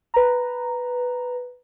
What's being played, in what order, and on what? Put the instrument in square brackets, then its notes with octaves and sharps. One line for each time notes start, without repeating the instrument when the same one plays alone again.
[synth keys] B4 A#5